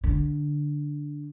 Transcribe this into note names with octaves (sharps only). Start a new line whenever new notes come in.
D3